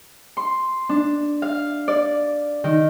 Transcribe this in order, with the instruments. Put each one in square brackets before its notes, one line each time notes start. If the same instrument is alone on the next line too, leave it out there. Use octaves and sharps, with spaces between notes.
[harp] C6
D4
F5
D5
D#3